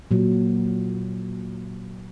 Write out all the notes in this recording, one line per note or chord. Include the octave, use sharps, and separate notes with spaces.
A#2 F#3